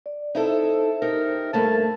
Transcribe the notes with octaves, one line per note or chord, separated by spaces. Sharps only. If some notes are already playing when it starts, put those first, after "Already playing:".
D5
D#4 E4 A4 C5 E5
D#4 G4 A#4
G2 A3 A#3 A5